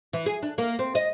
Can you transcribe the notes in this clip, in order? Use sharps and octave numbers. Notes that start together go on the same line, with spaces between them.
E3
G#4
D4
A#3
C4
D#5